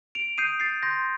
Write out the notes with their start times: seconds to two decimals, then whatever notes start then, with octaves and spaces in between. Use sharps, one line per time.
0.15 D7 F7
0.38 D#6 G6 C7 D#7
0.60 A6 C7
0.83 C6 G6 A#6